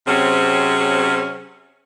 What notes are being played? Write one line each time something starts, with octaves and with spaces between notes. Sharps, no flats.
C3 F#3 C4 C#4 G#4